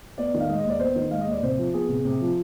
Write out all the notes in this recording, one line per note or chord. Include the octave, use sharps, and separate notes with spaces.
B3 D5
D#3
F5
G#3 D#5
D#5
D#2
D5
B3 C5
D#3
G#3 F5
D#5
D#2
D5
C3 C5
F3
B3 G#4
C3
C3
F3